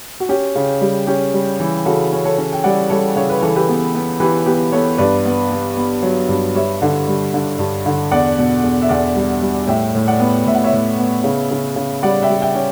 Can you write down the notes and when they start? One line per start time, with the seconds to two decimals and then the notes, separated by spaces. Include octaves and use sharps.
0.20 F#4
0.29 C#4 G4
0.55 C#3
0.81 G3
1.07 C#4 G4
1.33 G3
1.60 E3
1.86 C#3 F#4 A4
2.13 C#4
2.25 A4 C#5
2.38 C#4
2.53 G5
2.64 G3 D5 F#5
2.90 G3 A4 C#5
3.16 C#3 C#5
3.29 B4
3.43 E3 A4
3.56 G4 B4
3.69 B3
3.95 B3
4.20 E3 G4 B4
4.46 B3 G4 B4
4.72 B3 A4 C#5
4.98 G2 B4 D5
5.25 B3
5.51 B3
5.77 B3
6.03 F#3
6.29 G2
6.55 G3 C#5 E5
6.82 D3
7.08 G3
7.34 D3
7.59 G2
7.86 D3
8.11 E2 D5 F#5
8.38 B2
8.64 E2
8.81 E5
8.89 E2 D5 F#5
9.15 G3
9.42 G3
9.67 A2 E5 G5
9.95 A2
10.08 D5 F#5
10.20 B3
10.46 A2 E5
10.55 F#5
10.64 C#5 E5
10.73 A2
10.98 B3
11.24 C#3
11.51 C#3
11.76 C#3
12.03 G3 D5 F#5
12.22 E5 G5
12.29 G3
12.41 E5 G5
12.55 C#4